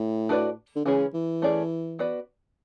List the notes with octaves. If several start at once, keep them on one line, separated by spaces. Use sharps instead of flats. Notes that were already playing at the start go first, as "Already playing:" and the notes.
Already playing: A2
D4 F#4 B4 D5
D3
C#3 E3 G#3 C#4 G#4
E3
A3 C#4 G#4 D5
B3 F#4 B4 D5